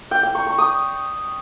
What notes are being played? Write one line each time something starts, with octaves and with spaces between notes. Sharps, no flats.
G5
G5
C#6
C#6
D#6